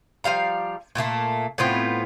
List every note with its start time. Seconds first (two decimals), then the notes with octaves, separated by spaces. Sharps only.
0.24 F3 G3 F5 A#5
0.95 A#2 A3 A#3 A5
1.58 A2 B3 C4 F4